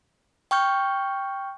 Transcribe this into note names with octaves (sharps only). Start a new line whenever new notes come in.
G5 C#6 F6 G6